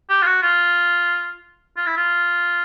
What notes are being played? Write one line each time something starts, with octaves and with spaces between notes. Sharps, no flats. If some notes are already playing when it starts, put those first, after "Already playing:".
G4
F4
F#4
F4
F4
E4
F4